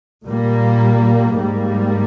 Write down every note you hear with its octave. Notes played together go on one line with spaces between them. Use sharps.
A#2 G3 A#3
G#2 G3 A#3